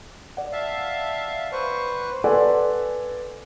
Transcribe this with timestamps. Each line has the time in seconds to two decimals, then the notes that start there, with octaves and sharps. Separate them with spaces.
0.37 D5 F#5
0.52 E5 F5 A5
1.52 B4 C5 C#6
2.24 A4 B4 D5 F#5 G#5 C6